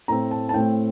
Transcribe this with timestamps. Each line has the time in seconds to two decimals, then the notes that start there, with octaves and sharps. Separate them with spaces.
0.08 A2 A3 C4 A#5
0.31 A5
0.49 A5
0.53 A2 A3 C4 G5